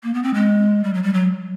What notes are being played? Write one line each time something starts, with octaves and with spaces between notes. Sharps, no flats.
A#3
B3
C4
G#3
G3
F#3
G3
F#3